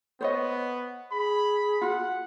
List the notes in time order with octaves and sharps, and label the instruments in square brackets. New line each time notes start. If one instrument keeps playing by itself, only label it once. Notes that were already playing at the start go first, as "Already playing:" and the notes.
[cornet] B3 [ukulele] C5 C#5 D#5
[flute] G#4 [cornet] B5
[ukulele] F4 F#4 [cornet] F#5